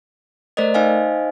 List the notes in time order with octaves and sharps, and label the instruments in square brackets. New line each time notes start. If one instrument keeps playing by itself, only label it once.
[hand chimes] A3 A#4 C5 D5 D#5
D#4 C5 D#5 F5 G#5